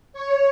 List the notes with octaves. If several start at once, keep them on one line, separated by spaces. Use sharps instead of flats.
C#5